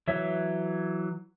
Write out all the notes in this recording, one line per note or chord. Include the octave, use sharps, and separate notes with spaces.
E3 F#3 C#5 E5